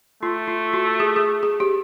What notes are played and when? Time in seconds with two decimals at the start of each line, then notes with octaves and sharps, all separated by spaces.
0.23 A3 F4
0.48 F4
0.73 F#4
1.00 G#4
1.16 G#4
1.43 G#4
1.60 G4